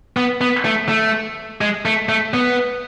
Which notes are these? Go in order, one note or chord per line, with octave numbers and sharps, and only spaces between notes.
B3
B3
A3
A3
G#3
A3
A3
B3